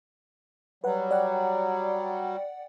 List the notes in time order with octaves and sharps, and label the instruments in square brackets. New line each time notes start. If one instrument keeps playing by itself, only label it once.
[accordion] F#3 G3 [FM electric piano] B4 F#5
[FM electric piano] D5 F#5 G5